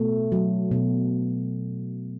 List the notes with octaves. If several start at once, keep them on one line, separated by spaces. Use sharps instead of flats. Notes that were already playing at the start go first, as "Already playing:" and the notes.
Already playing: B2 A3
F#3
B2